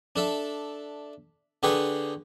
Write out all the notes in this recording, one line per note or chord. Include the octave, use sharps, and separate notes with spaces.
D4 A4 E5
D3 G4 G#4 B4 C#6